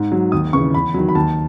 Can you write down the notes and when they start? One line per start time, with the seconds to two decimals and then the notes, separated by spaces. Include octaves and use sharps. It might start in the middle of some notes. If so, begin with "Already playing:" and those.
Already playing: G#2
0.12 F#3
0.32 D#2 D#6
0.53 C#3 E3 C#6
0.74 E2 B5
0.94 D#3 F#3
1.09 B5
1.15 D#2 A5